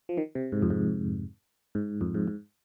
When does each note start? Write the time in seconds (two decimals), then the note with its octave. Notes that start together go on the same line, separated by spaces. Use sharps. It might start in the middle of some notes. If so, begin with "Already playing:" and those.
0.09 F3
0.17 D#3
0.35 C3
0.52 G#2
0.62 F2
0.70 G#2
1.75 G#2
2.01 F2
2.15 G#2
2.28 G#2